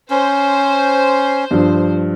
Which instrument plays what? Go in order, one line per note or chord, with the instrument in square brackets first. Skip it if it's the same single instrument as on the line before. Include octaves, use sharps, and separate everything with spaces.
[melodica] C#4 [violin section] C5
[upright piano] G2 F3